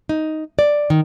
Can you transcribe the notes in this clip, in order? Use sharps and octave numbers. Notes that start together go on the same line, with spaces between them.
D#4
D5
D#3